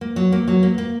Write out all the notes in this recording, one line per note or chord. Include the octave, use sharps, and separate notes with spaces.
A#3
F#3
A#3
F#3
A#3
A#3